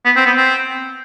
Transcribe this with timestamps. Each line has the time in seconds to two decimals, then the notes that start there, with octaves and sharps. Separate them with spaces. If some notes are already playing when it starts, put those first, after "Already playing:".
0.05 B3
0.16 C4
0.26 B3
0.37 C4